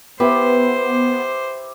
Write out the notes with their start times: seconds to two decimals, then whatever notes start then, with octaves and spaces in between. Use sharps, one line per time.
0.20 B3 E4 G4 B4 C5